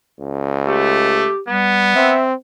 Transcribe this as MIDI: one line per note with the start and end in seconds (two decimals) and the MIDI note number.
0.19 1.26 37
0.67 1.30 57
0.67 1.40 67
1.48 1.92 55
1.48 2.14 59
1.96 2.34 60
1.96 2.24 76